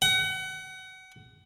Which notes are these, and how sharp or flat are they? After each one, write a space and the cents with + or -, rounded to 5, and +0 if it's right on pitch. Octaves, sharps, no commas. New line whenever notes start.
F#5 +30